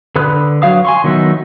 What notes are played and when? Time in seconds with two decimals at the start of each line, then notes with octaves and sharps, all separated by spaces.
0.16 D3 B4 B5 D#6 F#6
0.62 F#3 F5 D#6
0.85 G#5 C6 C#6
1.04 D#3 F#3 B3 D#4 E5